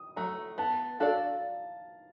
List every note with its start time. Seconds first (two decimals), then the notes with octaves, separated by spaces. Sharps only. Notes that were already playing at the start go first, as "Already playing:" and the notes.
Already playing: D#6
0.16 F#3 A3 A#5
0.58 B3 A5
1.00 D4 F#4 A4 D5 F5